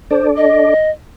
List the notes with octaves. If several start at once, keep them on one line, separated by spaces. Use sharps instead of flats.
D4 A4 C5 D5
D#5